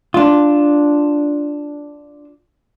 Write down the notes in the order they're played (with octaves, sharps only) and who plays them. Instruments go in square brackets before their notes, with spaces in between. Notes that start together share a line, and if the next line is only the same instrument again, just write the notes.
[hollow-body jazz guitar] D4 F4